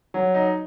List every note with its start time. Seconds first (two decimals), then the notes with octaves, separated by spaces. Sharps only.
0.14 F#3
0.34 D#4